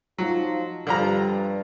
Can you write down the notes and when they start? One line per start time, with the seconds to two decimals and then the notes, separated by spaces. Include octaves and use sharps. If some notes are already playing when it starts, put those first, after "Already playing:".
0.18 F3 F#3 D#4 F4
0.87 G2 D3 F3 A#5